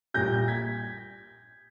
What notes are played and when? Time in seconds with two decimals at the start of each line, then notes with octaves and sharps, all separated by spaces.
0.14 A#1 A#2 G3 G6 A#6
0.48 G#6 B6